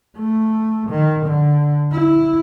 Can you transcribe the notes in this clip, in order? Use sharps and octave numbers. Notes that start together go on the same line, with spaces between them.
A3
D#3
D3
E4